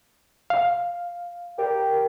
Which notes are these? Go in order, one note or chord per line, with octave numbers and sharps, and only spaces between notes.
F5
G4 A#4